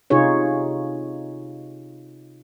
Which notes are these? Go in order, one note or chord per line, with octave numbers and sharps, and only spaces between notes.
C3 D#4 F4 G#4 C#5